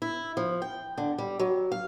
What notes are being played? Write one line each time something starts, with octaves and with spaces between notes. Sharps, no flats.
E4
F3
G5
D3
G3
F#3
F5